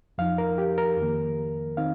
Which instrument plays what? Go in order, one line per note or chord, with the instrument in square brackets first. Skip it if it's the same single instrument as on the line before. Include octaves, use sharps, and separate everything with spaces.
[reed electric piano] F2 F3 D#4 F5
A#4
G4
A#4
F2 D#3 A#3
D#3 C4 D#4 F5